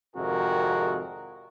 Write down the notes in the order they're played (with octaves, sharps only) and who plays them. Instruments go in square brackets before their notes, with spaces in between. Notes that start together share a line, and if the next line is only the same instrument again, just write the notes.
[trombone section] G#1 F2 C3 F#4 G#4 A#4